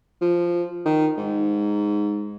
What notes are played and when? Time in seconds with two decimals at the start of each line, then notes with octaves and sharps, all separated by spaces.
0.21 F3
0.86 D#3
1.17 G#2